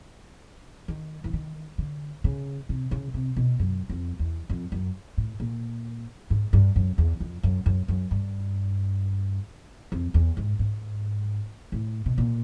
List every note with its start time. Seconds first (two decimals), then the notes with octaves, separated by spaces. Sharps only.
0.88 D#3
1.24 E3
1.33 D#3
1.78 D3
2.24 C#3
2.69 C3
2.91 C#3
3.14 C3
3.37 B2
3.59 F#2
3.89 F2
4.19 E2
4.50 F2
4.72 F#2
5.18 A2
5.40 A#2
6.30 G#2
6.53 G2
6.76 F#2
6.98 E2
7.20 F2
7.43 F#2
7.66 F#2
7.88 F#2
8.11 G2
9.92 F2
10.14 E2
10.37 G#2
10.59 G#2
11.72 A2
12.06 B2
12.18 A#2